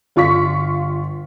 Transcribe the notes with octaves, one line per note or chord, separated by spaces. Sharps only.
G1 F4 C6 C#6 B6